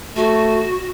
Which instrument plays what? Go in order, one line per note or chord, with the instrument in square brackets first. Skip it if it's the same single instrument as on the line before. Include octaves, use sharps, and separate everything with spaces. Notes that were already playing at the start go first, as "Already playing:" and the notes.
[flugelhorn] A3 [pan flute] F#4